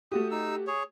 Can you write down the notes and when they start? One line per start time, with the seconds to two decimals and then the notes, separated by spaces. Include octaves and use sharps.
0.12 A3 F#4 G4 D#6
0.31 D#4 E6
0.67 G#4 C#5